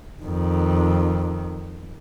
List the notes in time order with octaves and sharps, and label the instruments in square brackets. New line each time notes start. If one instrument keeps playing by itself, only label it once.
[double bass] F2 D#3